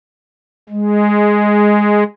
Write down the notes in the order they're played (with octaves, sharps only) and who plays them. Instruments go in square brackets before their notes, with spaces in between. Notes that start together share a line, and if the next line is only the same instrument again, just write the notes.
[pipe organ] G#3